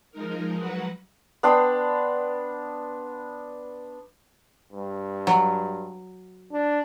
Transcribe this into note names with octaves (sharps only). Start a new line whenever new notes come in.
F3 G#3 D#4 A#4
F#3 F#4 B4 F#5
B3 D4 G5 C6
G2
F#3
D4